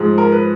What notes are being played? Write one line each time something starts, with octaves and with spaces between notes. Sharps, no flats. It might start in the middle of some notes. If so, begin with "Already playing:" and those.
Already playing: G#2 F3
A#4
B4